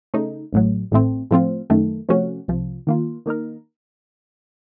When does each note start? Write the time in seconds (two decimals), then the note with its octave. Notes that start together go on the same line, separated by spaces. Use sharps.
0.14 C#3 A3 D#4
0.53 A1 A2 F#3
0.92 A1 A2 A3 C4
1.31 A2 F3 C4 F4
1.70 F#2 D#3 A3
2.09 C3 F3 A3 C#4 F#4
2.48 C2 C3 F3
2.87 D#3 A#3 F4
3.26 D#3 A#3 D#4 A#4